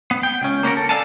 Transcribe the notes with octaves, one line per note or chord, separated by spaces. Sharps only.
B3
G5
C#2 C#4
A#3 C#4 F#4 A#4
A4
A4 A#4 D5 F5 G#5 A5